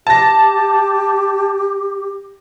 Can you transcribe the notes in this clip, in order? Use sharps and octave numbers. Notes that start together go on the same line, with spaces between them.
G4 A5 A#6